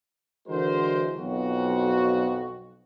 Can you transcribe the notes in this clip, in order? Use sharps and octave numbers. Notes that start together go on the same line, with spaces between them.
D3 E3 G#3 F#4 A#4 C5
B1 F2 F#4